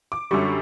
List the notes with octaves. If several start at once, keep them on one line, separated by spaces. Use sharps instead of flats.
D6
F#2 D3 G3 C#6